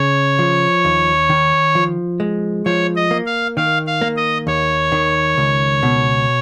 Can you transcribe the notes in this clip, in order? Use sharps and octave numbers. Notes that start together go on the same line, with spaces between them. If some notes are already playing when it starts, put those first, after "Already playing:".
Already playing: C#3 C#5
F3
D#2
D#3
F3
G#3
F3 C#5
D#5
A#3
F5
D#3 F5
F5
A#3
D#5
D#2 C#5
D#3
C#2
B2